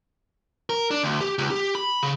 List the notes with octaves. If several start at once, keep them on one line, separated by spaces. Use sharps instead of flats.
A#4
D4
D2
G4
C#2
G4
B5
C#3